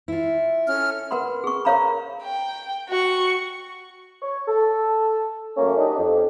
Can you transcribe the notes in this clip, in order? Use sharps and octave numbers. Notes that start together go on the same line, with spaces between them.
E4 F4
C#4 A4 F6
A#4 B4 F#5 B5 C6
G#4 C#6
A#4 C5 C#5 F5 A#5 B5
G5
F#4 C#6
C#5
A4
F#2 A3 A#3 C#4
G3 D4 D#4 G4 D#5
F2